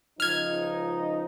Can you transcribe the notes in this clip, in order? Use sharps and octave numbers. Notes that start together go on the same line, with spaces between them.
C#2 F3 D#4 F6 G#6